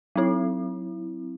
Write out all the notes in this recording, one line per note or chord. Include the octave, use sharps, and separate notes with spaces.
F#3 C4 E4